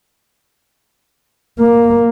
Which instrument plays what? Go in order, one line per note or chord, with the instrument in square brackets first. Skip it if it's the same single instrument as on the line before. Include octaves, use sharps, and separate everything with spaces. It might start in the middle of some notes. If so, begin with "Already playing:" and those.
[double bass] A#3